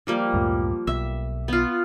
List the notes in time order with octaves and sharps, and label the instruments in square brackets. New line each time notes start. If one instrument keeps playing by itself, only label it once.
[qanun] F3 G3 A#3
[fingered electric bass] C#2 F#2 A2
[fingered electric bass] B1 [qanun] E5
[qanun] B3 F4